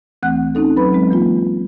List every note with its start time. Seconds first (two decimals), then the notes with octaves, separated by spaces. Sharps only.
0.23 D2 E3 A3 C4 F#5 F#6
0.55 C4 C#4 D#4 A4
0.77 F#3 B4 B5
0.93 G#3 C4
1.10 E3 A#3 F4